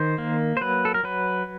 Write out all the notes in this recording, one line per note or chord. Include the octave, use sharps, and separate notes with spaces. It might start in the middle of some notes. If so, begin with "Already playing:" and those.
Already playing: D#3 C5
A#3
C5
F#3 B4
A4
A#4
F#3 B4